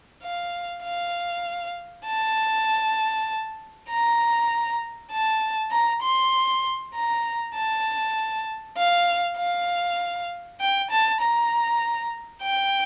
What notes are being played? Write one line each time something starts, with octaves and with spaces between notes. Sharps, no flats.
F5
F5
A5
A#5
A5
A#5
C6
A#5
A5
F5
F5
G5
A5
A#5
G5